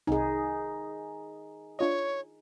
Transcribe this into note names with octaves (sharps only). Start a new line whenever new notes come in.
C2 C3 D#4 G#4 G#5
D4 F4 C#5 D#5